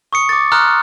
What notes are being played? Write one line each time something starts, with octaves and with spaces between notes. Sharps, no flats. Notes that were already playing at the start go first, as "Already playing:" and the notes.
C#6 D#6 C#7
D6 A6
A#5 C6 D#6 F6 F#6